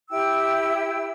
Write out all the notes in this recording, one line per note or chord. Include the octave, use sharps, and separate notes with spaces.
E4 G4 G5 E6